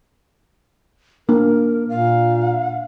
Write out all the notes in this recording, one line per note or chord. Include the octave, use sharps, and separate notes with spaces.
A#3 D4 A#4
A#2 F5